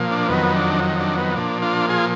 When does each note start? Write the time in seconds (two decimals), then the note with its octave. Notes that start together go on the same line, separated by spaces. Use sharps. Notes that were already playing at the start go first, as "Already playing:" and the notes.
Already playing: A#2 F3
0.11 D4
0.29 F2 D#3 F#3 B3
0.56 D4
1.00 D4
1.18 B3
1.36 A#2 F3 D4
1.62 D4 F4
1.89 F4 G#4